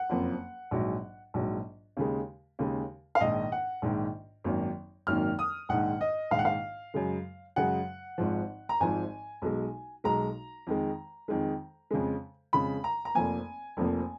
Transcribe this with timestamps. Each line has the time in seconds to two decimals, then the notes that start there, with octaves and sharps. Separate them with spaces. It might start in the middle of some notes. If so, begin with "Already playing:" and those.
Already playing: F#5
0.10 F#1 F2 F3 A#3
0.71 A#1 G#2 F#3
1.34 A#1 G#2 F#3
1.97 D#2 C#3 G#3
2.59 D#2 C#3 G#3
3.15 F5
3.21 A#1 G#2 D#3 D#5
3.52 F#5
3.82 A#1 G#2 D#3
4.44 G#1 F#2 D#3 A#3
5.07 G#1 F#2 D#3 A#3 F6
5.39 D#6
5.69 A#1 G#2 D#3 F#5
6.01 D#5
6.31 A#1 G#2 D#3 F5
6.39 F#5
6.45 F5
6.94 F#2 C#3 G#3
7.56 F#2 C#3 G#3 F#5
8.18 G#1 G#2 F3
8.69 A#5
8.80 G#1 G#2 F3 G#5
9.42 B1 B2 G#3
10.04 B1 B2 G#3 A#5
10.67 F2 D#3 G#3
11.28 F2 D#3 G#3
11.91 F2 C#3 G#3
12.53 F2 C#3 G#3 B5
12.84 A#5
13.05 A#5
13.15 F1 F2 F3 A#3 G#5
13.77 F1 F2 F3 A#3